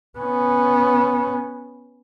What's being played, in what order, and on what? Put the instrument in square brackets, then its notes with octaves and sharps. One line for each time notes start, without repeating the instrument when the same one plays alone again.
[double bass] B3 C#4